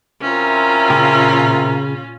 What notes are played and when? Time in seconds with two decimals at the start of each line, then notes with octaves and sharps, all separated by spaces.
0.22 C3 C#4 E4 F4 A#4
0.90 A#2 C#3 G4